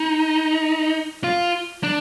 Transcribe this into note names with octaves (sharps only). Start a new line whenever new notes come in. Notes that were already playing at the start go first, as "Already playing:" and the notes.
Already playing: D#4
F4
D4